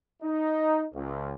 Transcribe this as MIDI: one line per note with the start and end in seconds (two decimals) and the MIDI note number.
0.23 0.85 63
0.94 1.35 37